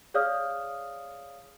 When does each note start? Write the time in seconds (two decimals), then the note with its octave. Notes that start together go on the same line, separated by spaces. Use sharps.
0.14 G#4 C#5 D5 F5 D#6 F6